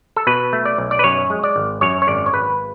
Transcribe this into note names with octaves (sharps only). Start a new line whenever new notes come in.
A4
B2 B4
A3
D5
B1
D5
B4
F#2 C#5
G#3
D5
G#1
F#2 C#5
C#5
G#1 D5
C#5
G#1 B4